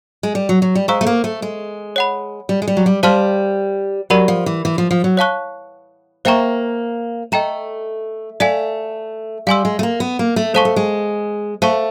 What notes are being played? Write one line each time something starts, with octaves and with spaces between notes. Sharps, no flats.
G#3
G3
F#3
F#3
G3
G#3 C5 F5 A#5 C#6 E6
A3
A#3
A3
G#3
C#5 F#5 B5
G3
G#3
G3
F#3
G3
G3 C5 F5 A5 C6 F6
F#3 G4 A#4 D5 F#5 B5
F3
E3
E3
F3
F3
F#3
C#5 F5 A5 C#6 F#6
A#3 C5 E5 G5 A#5 C#6
A3 D#5 G5 A#5
A3 D5 F5 G#5
G3 F5 G#5 C6 E6
G#3
A3
A#3
B3
A#3
A3
G#3 A4 C5 F5 A5 C#6
A3
G#3
A3 C5 F5 A5 C#6